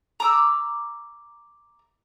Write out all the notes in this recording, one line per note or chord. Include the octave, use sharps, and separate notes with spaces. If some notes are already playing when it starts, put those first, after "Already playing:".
A#5 D6 E6